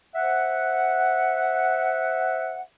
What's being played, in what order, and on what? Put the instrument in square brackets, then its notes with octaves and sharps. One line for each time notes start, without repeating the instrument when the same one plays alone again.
[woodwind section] C5 E5 F#5